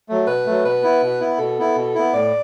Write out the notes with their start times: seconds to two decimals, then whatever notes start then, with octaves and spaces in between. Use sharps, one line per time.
0.09 F#3 A3
0.27 B2 B4
0.46 F#3 A3
0.64 B2 B4
0.83 B3 E4
1.02 B2
1.20 B3 E4
1.39 B2 A4
1.58 B3 E4
1.76 B2
1.95 B3 E4
2.13 A2 D5